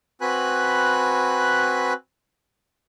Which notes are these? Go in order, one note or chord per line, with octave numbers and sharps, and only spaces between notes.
C4 F#4 B4 G#5 B5 F#6